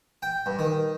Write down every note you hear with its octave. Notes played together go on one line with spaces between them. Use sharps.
G5
G2
D#3